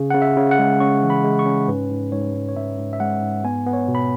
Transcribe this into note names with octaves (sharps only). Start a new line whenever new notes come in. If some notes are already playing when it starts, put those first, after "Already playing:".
Already playing: C#3
C#3 F#5
E5
C#3
F#5
G#3
C#4 C#6
E3
B5
G#3
C#6
C#4
G#2 B4
G#2
G#2 C#5
G#2
C#5
G#2 E5
G#2
E5
G#3 F#5
G#2
B3 G#5
B3
C#5
B2
B5